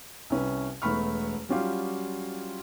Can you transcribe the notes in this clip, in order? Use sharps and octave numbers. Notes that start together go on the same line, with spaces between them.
C2 C#4 B4
E1 A3 B3 B5 C#6 F6
F#3 G3 C#4 F4 G4 F5